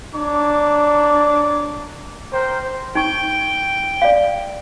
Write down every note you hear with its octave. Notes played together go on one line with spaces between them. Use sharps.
D4 C#5 A#5 D6
A#4 C5 G5
D#4 G5 C#6
D5 F5